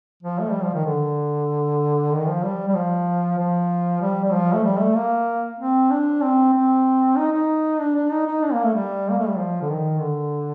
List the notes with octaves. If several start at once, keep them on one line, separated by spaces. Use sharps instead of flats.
F3
A3
G3
F3
D#3
D3
D#3
F3
G3
G3
F3
F3
G3
G3
F3
A3
G3
A3
A#3
C4
D4
C4
C4
D#4
D#4
D4
D4
D#4
D#4
D4
A#3
A3
G3
A#3
A3
G3
F3
D3
D#3
D3